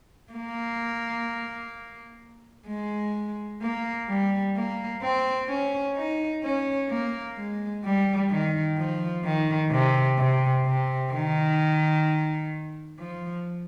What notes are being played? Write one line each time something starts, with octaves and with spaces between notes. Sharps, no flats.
A#3
G#3
A#3
G3
A#3
C4
C#4
D#4
C#4
A#3
G#3
G3
D#3
F3
D#3
C3
C3
C3
D#3
F3